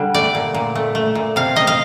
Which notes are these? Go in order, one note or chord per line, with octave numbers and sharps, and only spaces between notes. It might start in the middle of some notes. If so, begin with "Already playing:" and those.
Already playing: D3 G3
A3 D5
A#2
A#2
A3
A3
A#2
C3 F5
C3 D#5
F5